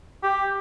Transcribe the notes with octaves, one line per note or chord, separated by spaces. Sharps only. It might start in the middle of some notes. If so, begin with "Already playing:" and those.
G4